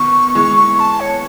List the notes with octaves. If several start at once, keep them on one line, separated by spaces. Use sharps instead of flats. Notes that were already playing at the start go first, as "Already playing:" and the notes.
Already playing: B2 D#3 C#6
E3 G#3 C#6
C#6
A5
C#5